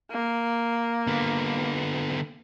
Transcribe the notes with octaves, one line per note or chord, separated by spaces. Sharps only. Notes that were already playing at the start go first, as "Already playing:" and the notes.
A#3
D3 B3